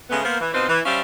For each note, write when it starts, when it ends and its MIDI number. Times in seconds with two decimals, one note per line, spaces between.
0.10 0.19 49
0.10 0.19 56
0.10 0.19 57
0.10 0.19 59
0.23 0.39 58
0.23 0.39 59
0.23 0.39 70
0.23 0.39 72
0.41 0.53 52
0.54 0.67 47
0.54 0.67 60
0.54 0.67 63
0.54 0.67 65
0.54 0.67 71
0.54 0.67 72
0.69 0.79 52
0.85 1.01 55
0.85 1.01 61
0.85 1.01 72
0.85 1.01 74
0.85 1.01 76
0.85 1.01 77